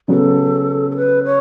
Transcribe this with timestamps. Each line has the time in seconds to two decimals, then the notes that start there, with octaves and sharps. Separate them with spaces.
0.08 C#3 F#3 B3 A4
0.91 A4
0.96 B4
1.24 C#5